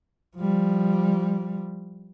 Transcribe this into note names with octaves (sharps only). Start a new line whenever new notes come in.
F3 G3